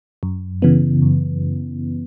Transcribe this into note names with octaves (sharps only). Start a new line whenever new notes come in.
F#2
C#3 E3 B3
F#2